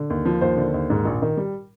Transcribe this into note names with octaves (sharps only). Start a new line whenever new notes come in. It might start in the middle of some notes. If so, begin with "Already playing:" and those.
Already playing: D3
D#2
F3
D#2 C5
D3
D#2
G#2
A#1
D#3
G3